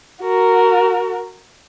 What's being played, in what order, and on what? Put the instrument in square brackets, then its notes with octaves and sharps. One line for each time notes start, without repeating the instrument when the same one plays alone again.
[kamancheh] F#4 A#4